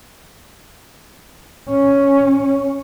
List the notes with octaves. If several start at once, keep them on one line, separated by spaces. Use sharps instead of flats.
C#4